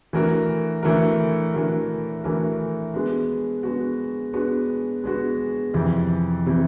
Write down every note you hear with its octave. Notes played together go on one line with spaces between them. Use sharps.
E3 A3 D4 F#4 A#4
E3 A3 D4 F#4 A#4
E3 A3 D4 F#4 A#4
E3 A3 D4 F#4 A#4
G#3 B3 D4 F#4
G#3 B3 D4 F#4
G#3 B3 D4 F#4
G#3 B3 D4 F#4
F2 C3 E3
C3 E3